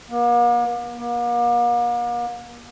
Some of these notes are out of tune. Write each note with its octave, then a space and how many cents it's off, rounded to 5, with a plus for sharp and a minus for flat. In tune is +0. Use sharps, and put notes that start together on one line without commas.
A#3 +45
A#3 +40